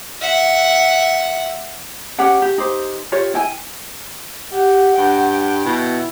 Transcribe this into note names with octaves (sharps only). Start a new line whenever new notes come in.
E5 F#5
C#4 G4 F#5 G5
G4
D#4 G4 C5
F4 G4 C#5
E4 G5 G#5
G4 F#5
G2 G5
B2 E4